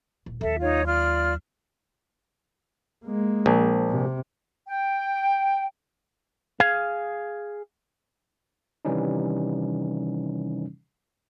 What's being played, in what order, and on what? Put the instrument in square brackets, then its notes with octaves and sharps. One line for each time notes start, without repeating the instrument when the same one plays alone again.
[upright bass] D#1
[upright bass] D#2 F#3 [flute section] A4 E5
[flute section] D#4 F4 C#5
F4 D5 F6
[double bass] G#3 A#3
[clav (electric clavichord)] A#1
[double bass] C3
[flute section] G5
[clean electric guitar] G#4 F5
[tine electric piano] C3 D#3 E3 G3 C#4 D#4